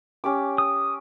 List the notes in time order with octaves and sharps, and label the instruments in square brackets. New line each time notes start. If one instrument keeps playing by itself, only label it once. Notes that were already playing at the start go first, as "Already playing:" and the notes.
[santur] C#4 G4 D6
[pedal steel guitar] D#6